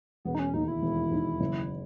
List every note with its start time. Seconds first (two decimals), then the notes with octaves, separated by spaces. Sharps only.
0.25 E1 B3
0.35 D#4
0.39 C#4
0.54 D#2 D#3 D#4
0.68 E4
0.83 E1
1.11 D#2 D#3
1.40 F#1